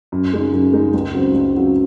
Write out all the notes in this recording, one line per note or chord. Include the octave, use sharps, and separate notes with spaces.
F#2
C#3 G#3 D#4
F#2
C#3 G#3 D#4
C#2
C#3 F#3 C4
C#2
C#3 F#3 C4